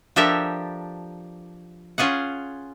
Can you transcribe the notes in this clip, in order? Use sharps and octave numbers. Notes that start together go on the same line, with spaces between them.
F3 D4 G4 A4 A#4 E5
C#4 F4 G#4 F#5